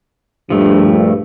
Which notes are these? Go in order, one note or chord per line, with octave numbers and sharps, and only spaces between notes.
A#1 G2 F3 A3